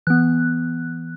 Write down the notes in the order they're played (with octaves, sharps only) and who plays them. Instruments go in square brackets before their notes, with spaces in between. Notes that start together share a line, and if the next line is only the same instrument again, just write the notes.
[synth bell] E3 B3 F#6